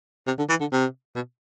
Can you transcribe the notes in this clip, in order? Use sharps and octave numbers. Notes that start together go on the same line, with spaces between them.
C3
D3
E3
D3
C3
B2